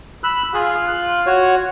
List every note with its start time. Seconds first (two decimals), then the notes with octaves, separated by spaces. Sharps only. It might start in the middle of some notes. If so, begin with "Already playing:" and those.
0.24 B5 E6 F#6
0.54 F4 G#4
0.88 F#6
1.26 F#4 C#5